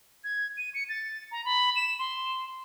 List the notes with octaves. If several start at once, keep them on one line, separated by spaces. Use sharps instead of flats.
G#6
D#7
C#7
A6
A#5
B5
E7
C6